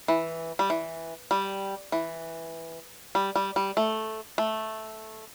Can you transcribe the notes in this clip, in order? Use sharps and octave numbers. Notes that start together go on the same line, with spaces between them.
E3
G3
E3
G3
E3
G3
G3
G3
A3
A3